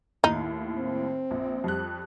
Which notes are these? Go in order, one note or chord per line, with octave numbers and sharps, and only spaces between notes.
D#2 A2 D#4
C4
A#1
F2 G3 F#6